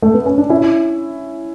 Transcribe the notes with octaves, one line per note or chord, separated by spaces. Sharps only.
A3
B3
C#4
D4
C#4 E4